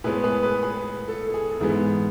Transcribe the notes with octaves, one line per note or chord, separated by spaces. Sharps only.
A2 G#3 B3 G#4 B4
G#4 B4
G#4 B4
G#4 B4
A4
A4
G#4
G#2 E3 G#3 B3